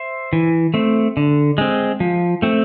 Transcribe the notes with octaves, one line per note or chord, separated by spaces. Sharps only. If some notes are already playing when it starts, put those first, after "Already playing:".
Already playing: C5 E5
E3
A3 C4
D3
G#3 C4
F3
A3 C4